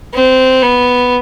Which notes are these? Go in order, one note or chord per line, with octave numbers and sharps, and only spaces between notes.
C4
B3